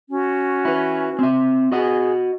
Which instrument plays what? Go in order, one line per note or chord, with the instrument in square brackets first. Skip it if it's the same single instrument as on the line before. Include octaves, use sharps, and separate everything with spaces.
[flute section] C#4 F#4
[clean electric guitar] E4 B4
C4 E5
[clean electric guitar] F#4 D#5 F#5 [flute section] G#4